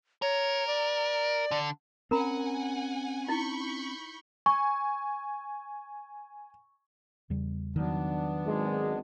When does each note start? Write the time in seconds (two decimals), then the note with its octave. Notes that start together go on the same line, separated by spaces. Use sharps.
0.22 A#4 C#5
0.67 D5
1.51 D3
2.11 C4 C#4 A#4 F#5 G#5 A#5 B5
3.28 D#4 E4 B5 C#6 G6
4.46 G#5 C#6
7.30 E2 C#3 G3
7.76 D#3 F#3 B3 D4
8.45 G#1 G#3